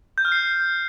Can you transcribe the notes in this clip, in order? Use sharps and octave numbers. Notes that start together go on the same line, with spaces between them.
G6
F6
C7